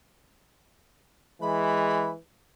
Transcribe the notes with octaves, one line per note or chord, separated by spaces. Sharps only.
E3 G#3 B5